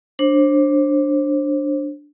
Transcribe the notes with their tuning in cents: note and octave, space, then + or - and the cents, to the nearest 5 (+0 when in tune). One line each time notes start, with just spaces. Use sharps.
D4 +0 C5 +30